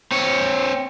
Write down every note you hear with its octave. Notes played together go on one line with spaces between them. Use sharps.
C4 C#5